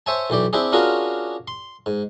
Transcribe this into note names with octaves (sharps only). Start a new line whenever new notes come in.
C5 C#5 E5 G#5 A5
B1 E3 G4 D5
C4 D4 E4 G4 G#4
C#4 D4 F4 F#4 G#4 A#4
C6
G#2